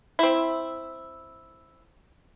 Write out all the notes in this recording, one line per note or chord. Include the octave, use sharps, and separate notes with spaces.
C4 E4